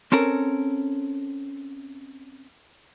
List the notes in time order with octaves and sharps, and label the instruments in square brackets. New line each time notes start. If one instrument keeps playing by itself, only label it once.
[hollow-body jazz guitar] C4 C#4 A4 A#4